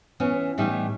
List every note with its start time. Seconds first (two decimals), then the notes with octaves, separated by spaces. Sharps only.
0.20 E3 B3 C#4
0.58 A2 E3 G3 D#4